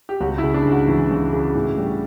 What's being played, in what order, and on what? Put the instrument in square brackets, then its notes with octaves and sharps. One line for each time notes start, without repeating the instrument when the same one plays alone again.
[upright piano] G4
[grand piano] C#2 [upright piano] F#4
[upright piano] E4
[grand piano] C#3
[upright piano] D4
[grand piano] C#2
[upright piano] F#4
[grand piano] E3
C#2
C#3
A2
G3